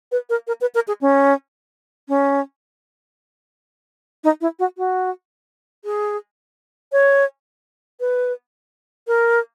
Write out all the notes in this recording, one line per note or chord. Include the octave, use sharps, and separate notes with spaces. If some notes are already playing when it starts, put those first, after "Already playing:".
B4
A#4
A#4
B4
A#4
G#4
C#4
C#4
D#4
E4
F#4
F#4
G#4
C#5
B4
A#4